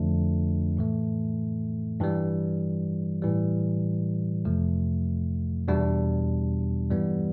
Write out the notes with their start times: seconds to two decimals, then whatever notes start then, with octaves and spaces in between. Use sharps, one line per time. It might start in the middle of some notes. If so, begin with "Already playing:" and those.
Already playing: F2 D3 F3 A3 D4
0.77 A2 E3 A3
2.00 G2 E3 G3
3.22 A2 E3 G3
4.45 F2 C3 F3 A3
5.68 E2 B2 G3 D4
6.91 G2 E3 G3 B3